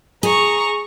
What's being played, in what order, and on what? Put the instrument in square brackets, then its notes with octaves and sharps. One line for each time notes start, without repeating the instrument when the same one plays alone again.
[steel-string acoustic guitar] G#4 [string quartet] A#5 C#6